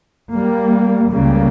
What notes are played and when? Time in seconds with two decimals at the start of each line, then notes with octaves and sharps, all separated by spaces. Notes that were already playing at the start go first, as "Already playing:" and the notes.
0.32 G3 A#3
1.12 C#2 C#3 G3 A#3